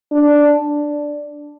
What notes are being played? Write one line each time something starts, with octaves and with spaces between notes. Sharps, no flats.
D4